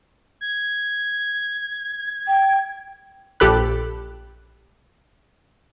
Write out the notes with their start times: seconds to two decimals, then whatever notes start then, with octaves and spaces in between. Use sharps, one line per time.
0.41 G#6
2.27 G5
3.40 A#1 G4 A4 B5 F#6